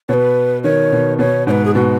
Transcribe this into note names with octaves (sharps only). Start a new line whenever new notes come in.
B2 B4 C#5
D#3 C#5
B2
B2 C#5
G#2 C#5
B4
G#4
B2 F#4